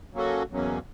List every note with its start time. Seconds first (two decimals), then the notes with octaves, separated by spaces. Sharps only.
0.14 F#3 A#3 C#4 F#4 A4
0.50 E2 B2 F#3 A#3 C#4